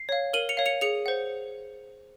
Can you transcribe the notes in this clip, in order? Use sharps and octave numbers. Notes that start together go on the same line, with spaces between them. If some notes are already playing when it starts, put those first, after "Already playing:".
Already playing: C7
C#5 F5
A#4 D#7 F#7
C#7 F7
C#5 F5
C#7 F7
G#4 C#7 F7
C5 F#5